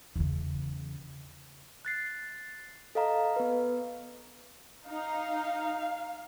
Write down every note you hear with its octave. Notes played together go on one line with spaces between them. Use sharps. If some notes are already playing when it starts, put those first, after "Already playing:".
E2 C#3
F#6 A6 C7
A4 D#5 F5 A#5
B3 B4
D#4 F5